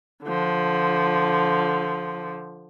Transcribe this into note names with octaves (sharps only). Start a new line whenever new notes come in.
D3 F3